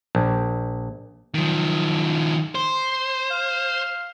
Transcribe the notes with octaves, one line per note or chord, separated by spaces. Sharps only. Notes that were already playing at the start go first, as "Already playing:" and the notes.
A#1
D#3 F3 F#3
C5 C6
F5